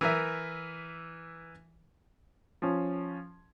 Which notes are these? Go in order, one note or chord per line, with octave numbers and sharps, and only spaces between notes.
E3 A#4 E5
F3 C#4